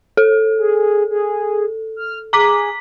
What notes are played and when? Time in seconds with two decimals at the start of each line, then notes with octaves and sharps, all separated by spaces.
0.17 A4
0.58 G#4
1.10 G#4
1.96 F6
2.33 G#4 A#5 D6 B6